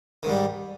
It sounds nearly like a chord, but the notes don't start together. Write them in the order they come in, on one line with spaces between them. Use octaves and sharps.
D#3 G#2 G3